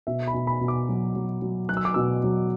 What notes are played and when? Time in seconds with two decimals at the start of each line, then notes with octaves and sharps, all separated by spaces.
0.07 B2 E5
0.28 B5
0.34 B2
0.47 B5
0.61 B2
0.68 D6
0.89 F#3
1.15 F#3
1.42 F#3
1.69 F#3 F#6
1.77 E6
1.85 D6
1.94 B2 E6
2.24 F#3